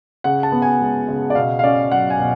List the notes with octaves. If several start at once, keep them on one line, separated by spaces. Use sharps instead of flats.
C#3 F#5
A5
B3
G#5
G#3
C#3
D5
B2 F5
F5
C#4 D5
F#3 F#5
G#5
B2